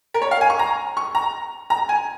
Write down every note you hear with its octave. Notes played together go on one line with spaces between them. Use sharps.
A#4
C#5
F5
G#5
C#6
A#5
C#6
A#5
A#5
G#5